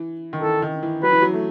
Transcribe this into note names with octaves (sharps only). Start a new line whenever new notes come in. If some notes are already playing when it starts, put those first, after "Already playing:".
Already playing: E3
D#3
E3 A4
D#3
E3
F#3 B4
E3
F#3
A3